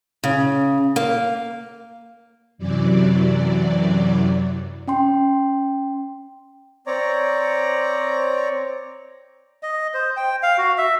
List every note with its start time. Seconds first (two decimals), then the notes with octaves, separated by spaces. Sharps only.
0.24 C#3
0.96 A#3
2.58 F#2 C3 E3 F#3 D5
4.88 C#4 G5 C6
6.87 C4 C#5 D5 A#5
9.63 D#5
9.94 C5
10.17 G5
10.43 F5
10.58 F#4
10.78 E5